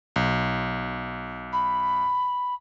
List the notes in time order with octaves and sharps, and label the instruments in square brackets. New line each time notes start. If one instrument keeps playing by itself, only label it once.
[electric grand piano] B1
[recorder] B5